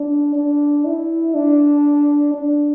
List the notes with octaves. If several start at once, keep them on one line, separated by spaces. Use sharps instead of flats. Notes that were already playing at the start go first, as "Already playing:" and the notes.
Already playing: D4
D4
E4
D4
D4